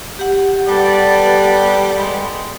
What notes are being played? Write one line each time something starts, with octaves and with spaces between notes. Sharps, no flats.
G4 F#5
G3 B3 A4 D5
G#3